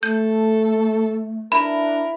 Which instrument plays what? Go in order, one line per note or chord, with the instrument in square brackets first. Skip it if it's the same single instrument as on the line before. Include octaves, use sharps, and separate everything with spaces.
[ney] A3 [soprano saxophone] A4 [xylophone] G6
[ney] D4 [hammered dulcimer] E4 B4 [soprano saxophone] A#4 [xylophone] B5